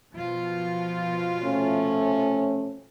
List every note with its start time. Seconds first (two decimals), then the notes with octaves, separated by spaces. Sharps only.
0.13 B2 F3 F4
1.43 C3 A3 C#4